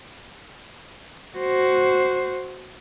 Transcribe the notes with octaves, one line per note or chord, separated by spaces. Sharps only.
F#4 C5